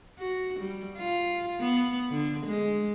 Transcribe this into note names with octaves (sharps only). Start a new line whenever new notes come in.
F#4
G3
F4
B3
D3
G#3